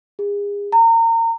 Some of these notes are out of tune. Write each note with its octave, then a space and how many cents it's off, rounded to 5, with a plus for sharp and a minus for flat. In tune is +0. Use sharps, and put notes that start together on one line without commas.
G#4 -35
A#5 -30